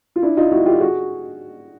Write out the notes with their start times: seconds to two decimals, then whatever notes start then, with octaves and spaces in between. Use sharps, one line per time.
0.16 F4
0.22 D4 E4
0.37 D#4 F4
0.52 E4 F#4
0.66 F4 G4
0.80 F#4 G#4